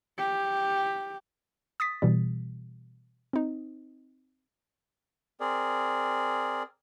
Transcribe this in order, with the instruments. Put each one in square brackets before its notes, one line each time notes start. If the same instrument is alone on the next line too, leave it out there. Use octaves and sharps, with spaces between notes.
[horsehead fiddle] G4
[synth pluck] D#6 A6 B6
B2 E3 G3
C4 D#4
[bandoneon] C4 G#4 A#4 D5